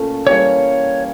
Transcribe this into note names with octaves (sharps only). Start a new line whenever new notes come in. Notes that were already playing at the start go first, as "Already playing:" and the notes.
Already playing: A#2 A3 C#4
E3 G3 A#3 C#5